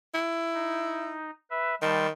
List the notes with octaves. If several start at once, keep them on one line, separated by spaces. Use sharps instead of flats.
E4
D#4
B4 E5
D#3 G3 A5 C6